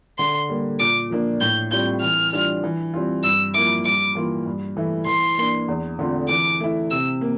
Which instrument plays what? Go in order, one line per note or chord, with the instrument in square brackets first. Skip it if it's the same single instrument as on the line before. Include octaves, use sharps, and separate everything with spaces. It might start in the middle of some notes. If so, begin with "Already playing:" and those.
[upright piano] D3 [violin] C6
[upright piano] G3 A#3
[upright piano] A#2 [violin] D6
[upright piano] F3 A#3 D4
[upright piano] A2 [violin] G6
[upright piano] G3 C4 F4 [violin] G6
[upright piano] E3 [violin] F6
[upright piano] G3 D4 F4
E3
G3 C4 F4
[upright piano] G2 [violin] E6
[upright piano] F3 A#3 E4 [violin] D6
[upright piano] G2 [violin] D6
[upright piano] E3 A#3 F4
G2
E3 A3 E4
[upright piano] E3 [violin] C6
[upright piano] A#3 D4
E2
D3 A3 C4 F4
[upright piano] E3 [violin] D6
[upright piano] A3 E4
[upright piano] C3 [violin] E6
[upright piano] A#3